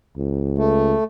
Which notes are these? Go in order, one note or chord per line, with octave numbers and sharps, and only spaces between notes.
C#2
A3